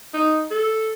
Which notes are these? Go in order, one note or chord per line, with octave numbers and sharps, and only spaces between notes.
D#4
A4